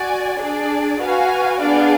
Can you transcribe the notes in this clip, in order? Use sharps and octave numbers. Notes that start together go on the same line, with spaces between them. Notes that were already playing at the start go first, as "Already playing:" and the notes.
Already playing: F#4 D5 G#5
D4 G#4 D5
F#4 B4 F5 G#5
B3 D4 G#4 D5 F5